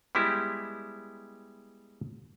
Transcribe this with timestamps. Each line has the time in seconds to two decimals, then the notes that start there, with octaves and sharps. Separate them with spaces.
0.15 G3 G#3 B3 E4 G4